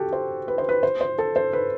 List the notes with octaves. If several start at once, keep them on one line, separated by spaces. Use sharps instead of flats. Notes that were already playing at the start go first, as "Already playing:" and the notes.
Already playing: F#4 G4 A4
C5
B4
C5
B4
C5
C5
A4
C5
B4